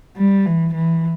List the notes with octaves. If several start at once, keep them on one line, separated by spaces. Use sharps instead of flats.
G3
E3
E3